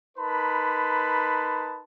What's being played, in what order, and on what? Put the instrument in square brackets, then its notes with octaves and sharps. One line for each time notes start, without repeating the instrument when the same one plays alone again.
[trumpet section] D#4 A#4 B4 A5 B5 C6